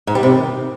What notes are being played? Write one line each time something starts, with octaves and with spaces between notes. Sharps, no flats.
G#2
G3
C3
D#3